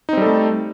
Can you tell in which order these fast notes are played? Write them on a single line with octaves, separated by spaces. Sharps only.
D#4 C4 G3 A4 A3